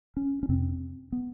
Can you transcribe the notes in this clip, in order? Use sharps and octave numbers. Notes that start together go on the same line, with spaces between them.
C#4
C#4
F2 C3 C4
B3